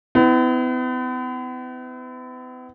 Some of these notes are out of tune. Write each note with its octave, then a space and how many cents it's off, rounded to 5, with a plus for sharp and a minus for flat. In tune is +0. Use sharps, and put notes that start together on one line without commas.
B3 +40 E4 -15